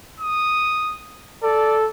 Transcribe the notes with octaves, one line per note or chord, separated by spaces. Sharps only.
D#6
A4 D5